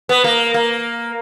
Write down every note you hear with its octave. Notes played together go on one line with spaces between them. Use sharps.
B3
A#3
A#3